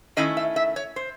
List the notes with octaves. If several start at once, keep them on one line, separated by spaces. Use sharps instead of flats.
D#3 A3 C#4 E4 D#5
E5
E5
C#5
C5